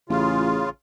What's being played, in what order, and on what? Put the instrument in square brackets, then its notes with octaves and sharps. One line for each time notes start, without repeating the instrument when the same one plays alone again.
[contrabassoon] A1 [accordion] C#3 F4